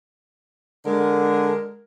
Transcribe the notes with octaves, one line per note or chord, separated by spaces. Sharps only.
D3 G#3 A#4